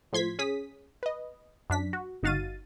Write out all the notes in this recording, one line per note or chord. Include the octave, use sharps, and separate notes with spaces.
A2 F3 C6 G#6 B6
C#4 G#4 D#6 B6
B4 D#5
F#2 D4 B6
F#4
G1 D#4 F#4 F5 A6 D#7